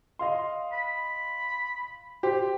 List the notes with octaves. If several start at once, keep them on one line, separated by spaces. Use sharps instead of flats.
D#5 F5 C6
B5
G4 C5